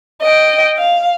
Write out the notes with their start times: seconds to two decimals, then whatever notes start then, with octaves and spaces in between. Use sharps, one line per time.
0.24 D#5 G5
0.78 F5